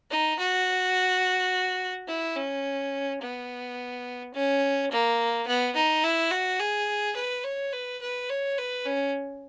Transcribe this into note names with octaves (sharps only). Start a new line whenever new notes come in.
D#4
F#4
E4
C#4
B3
C#4
A#3
B3
D#4
E4
F#4
G#4
B4
C#5
B4
B4
C#5
B4
C#4